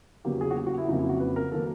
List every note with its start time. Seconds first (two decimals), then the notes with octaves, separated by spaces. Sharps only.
0.25 E2 C#3 F#3 A#3 G4
0.41 G#4
0.51 F#4
0.56 G4
0.67 F#4
0.78 E4
0.88 F2 C#3 F#3 A#3 D#4
0.99 E4
1.09 F#4
1.20 B4
1.36 A#4
1.52 D#3 F#3 A#3 A4